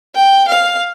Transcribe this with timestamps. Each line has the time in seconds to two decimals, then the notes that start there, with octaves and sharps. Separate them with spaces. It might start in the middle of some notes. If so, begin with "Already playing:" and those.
0.15 G5
0.48 F5